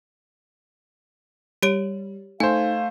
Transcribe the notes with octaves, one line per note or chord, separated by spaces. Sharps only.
G3 G4 C#5 D7
A3 D#4 C5 F5 G5 G#5 G#6